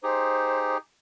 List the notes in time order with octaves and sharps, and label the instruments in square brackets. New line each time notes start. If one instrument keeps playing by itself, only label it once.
[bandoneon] D#4 G4 G#4 [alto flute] C5